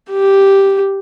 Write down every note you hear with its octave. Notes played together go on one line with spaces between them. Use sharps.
G4